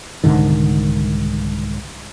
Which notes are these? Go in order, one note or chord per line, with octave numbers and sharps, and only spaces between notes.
C2 G#2 D3 D#3